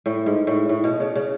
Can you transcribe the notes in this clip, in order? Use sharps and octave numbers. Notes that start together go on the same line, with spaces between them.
A2
G#2
A2
A2
B2
C#3
C#3